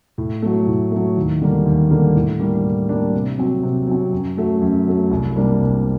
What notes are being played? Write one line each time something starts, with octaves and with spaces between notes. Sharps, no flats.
A2
F#3 A3
A2
F#3 A3
D#2
D3 G3 A#3
D#2
D3 G3 A#3
A2
G3 A#3 D4
A2
G3 A#3 D4
C3
F#3 C4
C3
F#3 C4
F#2
F#3 A3
F#2
F#3 A3
C2
C3 G3 A#3 D4
C2